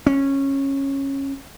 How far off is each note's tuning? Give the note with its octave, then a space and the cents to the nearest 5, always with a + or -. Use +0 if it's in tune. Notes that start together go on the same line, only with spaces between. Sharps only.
C#4 -15